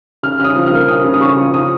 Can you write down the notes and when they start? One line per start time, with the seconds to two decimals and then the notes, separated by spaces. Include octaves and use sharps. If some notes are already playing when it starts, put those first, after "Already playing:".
0.23 C#3 F6
0.39 C#3 F6
0.44 D#6
0.55 F3
0.66 F6
0.72 A#3
0.88 C#3 D#6
1.04 C#3
1.14 D#6
1.21 C#3 C#6
1.37 F3
1.54 F3 D#6